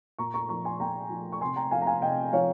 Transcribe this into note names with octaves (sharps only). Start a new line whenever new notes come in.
A#2 A#5 C#6
A#5 C#6
F3 A#5 C#6
G#5 C6
A#2 G5 A#5
F3
C#6
C3 G#5 C6
G5 A#5
F3 F5 G#5
A#5
F5 G#5
C3 D#5 G5
F3 C#5 F5